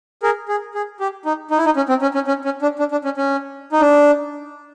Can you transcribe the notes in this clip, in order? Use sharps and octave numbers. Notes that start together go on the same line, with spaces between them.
G#4 A#4
G#4
G#4
G4
D#4
D#4
E4
D#4
C#4
C4
C#4
C#4
C#4
C#4
D4
D4
D4
C#4
C#4
D#4
D4